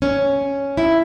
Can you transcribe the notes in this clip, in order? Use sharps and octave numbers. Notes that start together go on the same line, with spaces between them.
C#4
E4